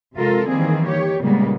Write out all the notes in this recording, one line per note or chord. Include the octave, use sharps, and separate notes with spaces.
C3 G#3 F4 A4 A#4
D#3 E3 G3 A#3 C4 G#4
D#3 G4 C#5
A#2 C#3 G3 G#3 A#3 B3